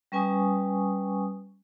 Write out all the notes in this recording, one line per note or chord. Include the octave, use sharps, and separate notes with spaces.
G3 C#4 B4 G#5 C#6 D#6